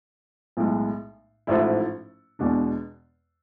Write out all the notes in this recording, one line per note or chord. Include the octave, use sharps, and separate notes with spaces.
B1 A2 G#3
A1 G#2 F3 A3 E4
E2 B2 G#3 D4